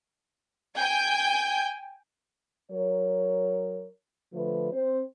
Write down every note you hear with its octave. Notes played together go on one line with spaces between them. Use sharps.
G5 G#5 G6
F#3 A#4 C#5
D3 F3 A3 B4
C4 C5